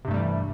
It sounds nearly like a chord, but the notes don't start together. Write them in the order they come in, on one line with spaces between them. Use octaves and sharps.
C3 G2 A3 G3 E3